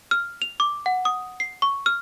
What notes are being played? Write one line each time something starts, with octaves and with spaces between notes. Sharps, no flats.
F6
F7
D6
F#5
D#6
C7
C#6
F6